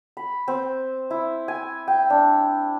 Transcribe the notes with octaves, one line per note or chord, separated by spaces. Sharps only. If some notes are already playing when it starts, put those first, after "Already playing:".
B5
C4
E4
G#5
G5
D4